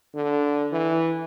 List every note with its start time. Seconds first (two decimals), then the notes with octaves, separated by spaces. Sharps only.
0.15 D3
0.72 E3